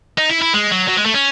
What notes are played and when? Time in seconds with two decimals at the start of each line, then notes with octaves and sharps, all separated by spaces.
0.18 D#4
0.30 E4
0.42 E4
0.54 G#3
0.71 F#3
0.88 F#3
0.97 G#3
1.05 A3
1.14 C#4